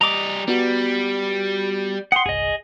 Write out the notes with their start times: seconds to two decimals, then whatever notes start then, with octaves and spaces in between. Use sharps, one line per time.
0.01 G3 D#5 A#5 D6
0.48 G3 B3 F#4
2.12 F#5 G5 C6 D#6
2.26 G1 C2 G#4 D#5